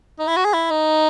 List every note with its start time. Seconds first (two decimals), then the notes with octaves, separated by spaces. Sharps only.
0.19 D#4
0.27 E4
0.37 F#4
0.45 G#4
0.54 E4
0.71 D#4